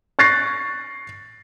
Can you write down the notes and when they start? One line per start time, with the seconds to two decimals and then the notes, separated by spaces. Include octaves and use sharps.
0.19 C#6 F#6 A6 A#6 C7